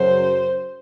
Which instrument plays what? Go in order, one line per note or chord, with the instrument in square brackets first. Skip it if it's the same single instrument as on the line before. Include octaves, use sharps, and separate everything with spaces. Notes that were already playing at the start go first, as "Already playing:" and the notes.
Already playing: [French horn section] F#2 C#3 F#3 [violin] C5